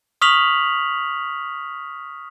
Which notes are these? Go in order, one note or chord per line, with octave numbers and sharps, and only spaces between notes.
C#6 D#6 F6 B6 F7 F#7